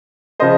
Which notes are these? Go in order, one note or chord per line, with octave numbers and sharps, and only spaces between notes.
C#3 F3 C5 D#5